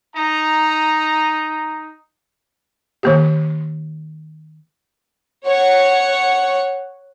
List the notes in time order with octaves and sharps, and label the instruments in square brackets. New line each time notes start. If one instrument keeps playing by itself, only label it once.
[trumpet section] D#4 A#5
[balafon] D#3 A#3 G4
[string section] C#5 F#5